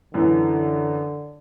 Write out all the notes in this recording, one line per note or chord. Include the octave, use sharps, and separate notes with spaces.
F#2 D3 E3